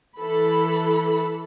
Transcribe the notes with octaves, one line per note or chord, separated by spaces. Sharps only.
E3 A4 B5